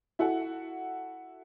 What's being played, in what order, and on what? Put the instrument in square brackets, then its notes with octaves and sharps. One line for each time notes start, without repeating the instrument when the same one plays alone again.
[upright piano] E4 F#4 A4 F#5